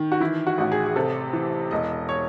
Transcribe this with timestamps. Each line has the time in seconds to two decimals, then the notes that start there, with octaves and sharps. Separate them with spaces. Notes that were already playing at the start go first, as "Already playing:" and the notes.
Already playing: D#3
0.12 F#4
0.20 E3 E4
0.47 F#4
0.58 A1 F#4
0.72 G#4
0.86 G#4
0.96 C3 A4
1.33 E3
1.71 E1 D#5
2.09 C#5